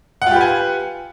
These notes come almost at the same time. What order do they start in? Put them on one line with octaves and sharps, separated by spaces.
F#5 F4 G4 B4 G#5